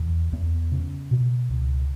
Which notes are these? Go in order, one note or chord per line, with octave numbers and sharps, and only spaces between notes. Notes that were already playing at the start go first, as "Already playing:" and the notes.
Already playing: E2
E2 B3
C#3
B2
C#2